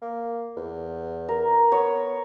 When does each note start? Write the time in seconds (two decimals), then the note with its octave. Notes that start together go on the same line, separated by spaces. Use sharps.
0.02 A#3
0.57 E2
1.29 A#4
1.72 B3 C#5